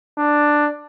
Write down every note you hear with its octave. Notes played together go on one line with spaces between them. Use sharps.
D4